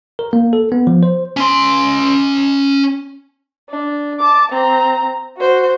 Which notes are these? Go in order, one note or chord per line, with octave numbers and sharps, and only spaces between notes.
A#4
A#3
A4
B3
F3
C5
C#4 C6
D4
A5 D6
C4 A#5
F#4 C5